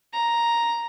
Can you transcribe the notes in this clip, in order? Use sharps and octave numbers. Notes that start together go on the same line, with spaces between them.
A#5